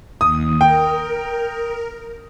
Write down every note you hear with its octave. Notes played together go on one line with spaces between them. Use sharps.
D#2 D#6
A#4 G5